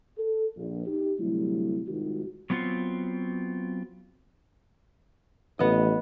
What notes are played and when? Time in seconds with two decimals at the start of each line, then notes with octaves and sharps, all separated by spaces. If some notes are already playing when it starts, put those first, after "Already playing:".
0.18 A4
0.57 A#1
0.87 D#4 G4
1.20 D2 C3 F#3 G3 A3 E4
1.88 C2 G#2 D#3 F4 F#4
2.50 F#3 B3 C4 F4 F#4
5.59 A1 B3 D#5